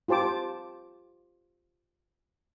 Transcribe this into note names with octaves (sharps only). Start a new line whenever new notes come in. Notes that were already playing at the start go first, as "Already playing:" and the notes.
F4 G4 C5 A5 D6